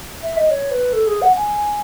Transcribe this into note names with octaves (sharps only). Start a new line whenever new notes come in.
E5
D#5
C#5
B4
A4
G#4
F#5
G#5